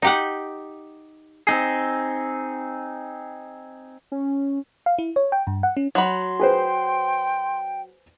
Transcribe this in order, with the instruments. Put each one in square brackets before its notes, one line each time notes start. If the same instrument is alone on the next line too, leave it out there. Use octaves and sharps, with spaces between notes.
[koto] D#4 G4 F#5
[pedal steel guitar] C4 D#4 G#4
[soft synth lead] C#4
[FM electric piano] F5
E4
C#5
G5
G2
F#5
C#4
[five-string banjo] F#3 B5 [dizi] C6
[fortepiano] G#4 B4 C5 [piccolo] G5